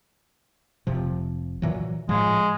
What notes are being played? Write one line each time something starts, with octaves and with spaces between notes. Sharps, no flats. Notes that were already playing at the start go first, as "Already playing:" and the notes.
F1 C3 F3
A#2 E3 F#3
A2 F3 G#3